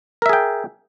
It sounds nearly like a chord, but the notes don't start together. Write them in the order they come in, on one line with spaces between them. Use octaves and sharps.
A#4 E5 G#4 G5